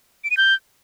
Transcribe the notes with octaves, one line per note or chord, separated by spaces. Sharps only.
D7
D#7
G6